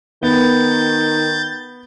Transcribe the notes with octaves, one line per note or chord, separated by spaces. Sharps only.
D#3 B3 G6 A6